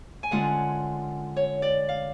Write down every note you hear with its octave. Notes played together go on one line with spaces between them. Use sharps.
G#5
D3 G#3 C#4 F4 F#5
C#5
D5
F5